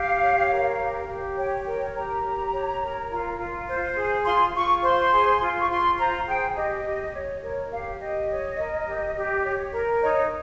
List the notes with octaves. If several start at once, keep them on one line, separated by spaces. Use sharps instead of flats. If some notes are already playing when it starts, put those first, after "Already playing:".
Already playing: G4 F5
C#5
A#4
G4
G4
C#5 G5
A#4 G5
G4 A#5
G4
C#5
A#4
F4
F4
C5
G#4
F4 C6
F4 C#6
C5 C6
G#4
F4
C#6
F4 C6
C5 A#5
G#4 G5
G4 D#5
G4
C#5
A#4 C#5
G4 F5
G4 D#5
C#5
A#4
G4
G4
C#5
A#4
D#4 C#5